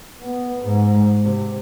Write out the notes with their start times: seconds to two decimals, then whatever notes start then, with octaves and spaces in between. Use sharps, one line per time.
0.22 B3
0.62 G#2
1.24 C3